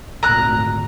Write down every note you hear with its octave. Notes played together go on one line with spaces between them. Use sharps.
G#1 D2 A#2 A#5 F#6